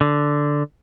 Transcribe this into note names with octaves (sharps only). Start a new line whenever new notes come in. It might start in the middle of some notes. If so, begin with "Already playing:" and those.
D3